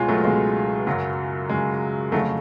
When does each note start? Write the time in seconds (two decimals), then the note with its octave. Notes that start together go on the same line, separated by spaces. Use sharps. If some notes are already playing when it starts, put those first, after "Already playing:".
Already playing: C#2 B2 G#3 C#4 F4
0.08 F#3 A3
0.24 C#2 B2 G#3
0.87 F#2 C#3 F#3
1.49 F#2 C#3 G#3
2.12 F2 C#3 F#3 A3